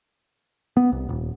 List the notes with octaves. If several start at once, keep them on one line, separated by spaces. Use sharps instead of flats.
B3
C2
D#1